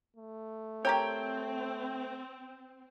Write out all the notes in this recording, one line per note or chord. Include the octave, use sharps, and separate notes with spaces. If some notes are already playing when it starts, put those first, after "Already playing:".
A3
C4 G4 A#4 C#5 G5